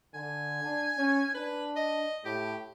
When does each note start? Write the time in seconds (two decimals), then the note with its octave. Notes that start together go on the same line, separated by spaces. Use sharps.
0.14 D3 G#5
0.63 D4
0.98 C#4
1.34 D4 B4
1.76 D#5
2.25 A2 G4